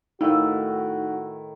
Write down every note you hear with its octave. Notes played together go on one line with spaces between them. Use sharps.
A2 D#3 D#4 E4 F#4 F5